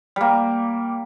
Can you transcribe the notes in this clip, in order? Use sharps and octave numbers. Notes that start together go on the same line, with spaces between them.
G3 A#3